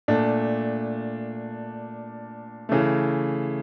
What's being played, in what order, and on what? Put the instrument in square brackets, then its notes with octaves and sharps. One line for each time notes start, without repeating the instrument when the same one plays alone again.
[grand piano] A#2 A3 D4
C#3 E3 A3